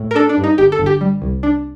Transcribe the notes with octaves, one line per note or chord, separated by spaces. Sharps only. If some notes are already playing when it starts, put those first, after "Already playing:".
Already playing: A2
A#4
D4 A4
D4
G2
D#4
G1 G4
A4
G1
G4
G3
C2
D4